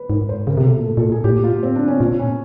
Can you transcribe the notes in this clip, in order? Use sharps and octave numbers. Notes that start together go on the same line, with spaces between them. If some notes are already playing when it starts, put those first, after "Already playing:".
Already playing: B4
G#2 A#4
C5
C#3 A#4
C3
B2 A4
A#2
A2 A4
A#2 A4
A2
G#4
A2 G4
A#2
A2 F4
C4
D4
C#4
A#2
C#4